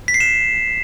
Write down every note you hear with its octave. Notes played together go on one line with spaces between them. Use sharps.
B6
C7
E7